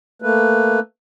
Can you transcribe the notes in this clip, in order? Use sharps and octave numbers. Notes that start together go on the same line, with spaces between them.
A3 A#3 B4